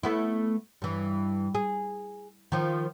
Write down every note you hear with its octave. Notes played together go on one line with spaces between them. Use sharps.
A3 B3 E4
G2 E3
G#4
D#3 F3